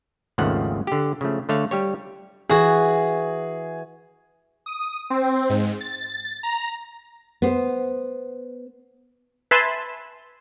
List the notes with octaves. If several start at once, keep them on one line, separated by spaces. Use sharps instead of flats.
G#1 D#2 C#3 F3 A3 F#5
D3 G4
C#3 F3 A3
D3 A3 C#5 F5
G3 G4 C#5
E3 F#4 G#4
D#6
C4
G#2
A6
A#5
B3 C5
B4 E5 G#5 A5 B5 C6